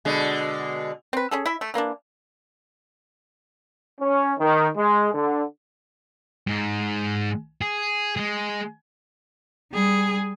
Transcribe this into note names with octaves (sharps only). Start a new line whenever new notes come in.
B2 D3 G#3
C4 B4
C#4 G#4 A4
E4 E5
A3
E3 A#3 C#4 D4
C#4
D#3
G#3
D3
G#2 G#3
G#4
G#3 G#4
G3 G#4